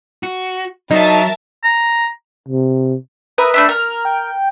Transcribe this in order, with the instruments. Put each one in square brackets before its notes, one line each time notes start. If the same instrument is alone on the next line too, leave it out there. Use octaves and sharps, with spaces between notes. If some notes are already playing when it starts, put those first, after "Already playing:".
[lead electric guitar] F#4
[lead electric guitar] F#3 [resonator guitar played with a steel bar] D#4 [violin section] A#4 E5 A5
[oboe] A#5
[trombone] C3
[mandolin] A#4 E5 D#6 [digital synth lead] B4
[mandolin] A3 D4 E5
[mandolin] A#4 [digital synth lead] F6
[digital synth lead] G5